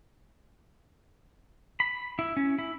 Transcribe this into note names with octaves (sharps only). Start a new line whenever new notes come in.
B5
E4
C#4
E4